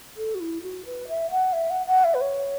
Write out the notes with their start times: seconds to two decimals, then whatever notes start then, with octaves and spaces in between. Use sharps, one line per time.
0.17 A4
0.35 F#4
0.40 E4
0.62 F#4
0.85 B4
1.08 E5
1.31 F#5
1.53 E5
1.70 F#5
1.87 F#5
2.04 E5
2.14 B4
2.21 C#5